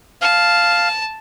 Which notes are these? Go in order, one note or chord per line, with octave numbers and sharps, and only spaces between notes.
F5 A5